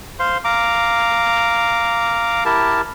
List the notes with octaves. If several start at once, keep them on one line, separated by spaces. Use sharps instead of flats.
C5 F5 C6
F5 A#5 D6
E4 G4 A#4 A5